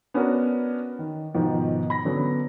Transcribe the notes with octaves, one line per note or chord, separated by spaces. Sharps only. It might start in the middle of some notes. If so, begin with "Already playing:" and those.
B3 C#4 D4 F#4 A#4
D#3
G#2 B2 D#3 F3
B5 A#6
D3 F#3 B3 C#4